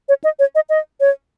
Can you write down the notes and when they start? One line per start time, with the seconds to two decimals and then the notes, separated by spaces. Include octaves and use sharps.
0.09 C#5
0.24 D#5
0.39 C#5
0.55 D#5
0.69 D#5
1.00 C#5